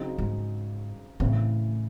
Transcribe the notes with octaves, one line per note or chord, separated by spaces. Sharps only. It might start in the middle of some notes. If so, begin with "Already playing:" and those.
Already playing: C#3 F#3 C4 D#4 G#4
G#2
A2 C#3 E3 C4